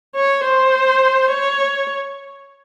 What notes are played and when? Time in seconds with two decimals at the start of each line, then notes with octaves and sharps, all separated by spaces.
0.16 C#5
0.44 C5
1.31 C#5